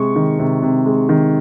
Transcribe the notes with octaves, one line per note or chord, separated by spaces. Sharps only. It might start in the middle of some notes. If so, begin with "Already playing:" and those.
Already playing: C3 G#3 C#6
D#3
C3
C3
G#3
D#3